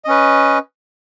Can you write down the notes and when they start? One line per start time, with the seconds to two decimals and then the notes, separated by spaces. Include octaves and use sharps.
0.05 D#5
0.07 C#4
0.10 B4